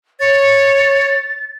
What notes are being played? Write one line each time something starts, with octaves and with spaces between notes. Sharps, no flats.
C#5 A6